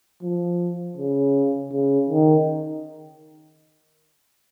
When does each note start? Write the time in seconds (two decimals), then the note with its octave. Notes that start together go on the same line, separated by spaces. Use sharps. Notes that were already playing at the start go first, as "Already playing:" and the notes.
0.23 F3
0.97 C#3
1.73 C#3
2.10 D#3